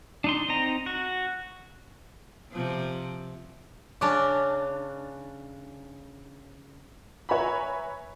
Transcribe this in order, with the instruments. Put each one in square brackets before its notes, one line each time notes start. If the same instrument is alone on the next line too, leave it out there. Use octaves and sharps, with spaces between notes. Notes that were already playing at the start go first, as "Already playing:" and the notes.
[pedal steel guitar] D4 D#4 C6
C4 D#4 A#5
F#4
[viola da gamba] C3 F3
[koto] C#3 C#4 D4 [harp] D6
[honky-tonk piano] B4 C#5 E5 G#5 A#5 B5